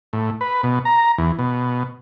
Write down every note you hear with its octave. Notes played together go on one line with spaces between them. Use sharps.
A2
B4
B2
A#5
E2
B2